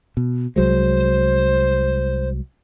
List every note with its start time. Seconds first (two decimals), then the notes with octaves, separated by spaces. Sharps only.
0.17 B2
0.56 C2 F#3 G#3 C5